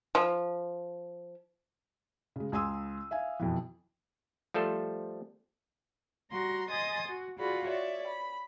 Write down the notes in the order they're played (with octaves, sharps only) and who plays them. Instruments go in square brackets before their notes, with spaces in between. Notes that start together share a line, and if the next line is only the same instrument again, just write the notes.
[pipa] F3
[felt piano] C#3 G#3
C#2 G#5 C6 D#6 E6
E5 F5 G#5
F2 B2 E3
[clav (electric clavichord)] F3 G3 A3 A4 C5
[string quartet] G3 F#4 A#5 C6
D#5 G#5 C6 D#6 A6
F#4
F4 F#4 G#4 D5 B5
C#5 D5 E5
B5